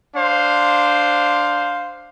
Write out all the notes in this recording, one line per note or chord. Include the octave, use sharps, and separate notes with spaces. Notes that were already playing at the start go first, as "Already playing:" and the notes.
D4 C5 F5